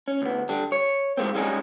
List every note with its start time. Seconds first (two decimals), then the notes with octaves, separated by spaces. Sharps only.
0.08 C#4
0.22 D2 B3
0.49 D3 G3 D4
0.72 C#5
1.17 A2 G#3 A#3 C4
1.35 G3 G#3 C#4 D#4 G4 G#4